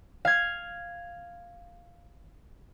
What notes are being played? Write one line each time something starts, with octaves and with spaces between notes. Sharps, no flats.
F5 G#6